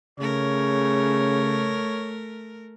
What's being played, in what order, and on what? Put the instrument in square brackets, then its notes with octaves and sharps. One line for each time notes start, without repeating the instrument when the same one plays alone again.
[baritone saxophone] C#3 [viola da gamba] A3 A#4 [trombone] C#5